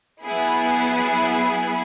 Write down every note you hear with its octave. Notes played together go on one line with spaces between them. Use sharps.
F#3 B3 E4 G#4